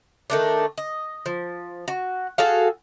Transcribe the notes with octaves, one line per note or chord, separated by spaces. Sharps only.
D#3 A3 D4
D#5
F3
F#4
F#4 G#4 A4 F5